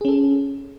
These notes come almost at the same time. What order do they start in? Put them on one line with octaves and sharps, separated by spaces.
G#4 C#4 A4